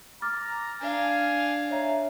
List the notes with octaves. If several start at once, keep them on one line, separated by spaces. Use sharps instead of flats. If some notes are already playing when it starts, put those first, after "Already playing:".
A#5 D6 F6 A6
D4 F5 G#5
C#5 E5 A#5